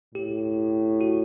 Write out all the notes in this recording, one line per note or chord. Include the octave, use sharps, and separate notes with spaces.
A2 G4
F#4